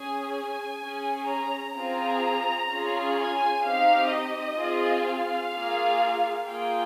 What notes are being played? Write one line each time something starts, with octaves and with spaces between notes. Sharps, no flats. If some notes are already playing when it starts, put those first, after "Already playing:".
Already playing: C#4 G#4 G#5
G#5
C#4 G#4
A#5
C4 F4 G#4 A#5
C#4 F4 G#4
G#5
C4 D#4 G4 F5
D#5
C4 F4 G#4
F5
A#3 F4 G#4
A#3 F4 G#4 G5